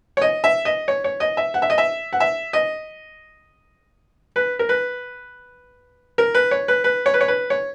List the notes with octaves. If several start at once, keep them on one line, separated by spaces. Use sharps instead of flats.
C#5
D#5
E5
D#5
C#5
C#5
D#5
E5
F#5
E5
D#5
E5
F#5
E5
D#5
B4
A#4
B4
A#4
B4
C#5
B4
B4
C#5
B4
C#5
B4
C#5